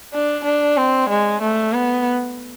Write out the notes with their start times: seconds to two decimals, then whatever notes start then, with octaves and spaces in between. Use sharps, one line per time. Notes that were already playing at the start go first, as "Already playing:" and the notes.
0.13 D4
0.44 D4
0.77 C4
1.09 G#3
1.41 A3
1.73 B3